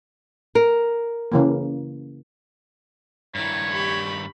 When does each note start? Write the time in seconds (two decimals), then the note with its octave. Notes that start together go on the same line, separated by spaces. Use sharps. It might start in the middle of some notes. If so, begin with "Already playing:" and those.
0.55 A#4
1.32 C#3 E3 A#3
3.35 G2 D#3 E4 C#5 B5
3.71 G4 B5 C#6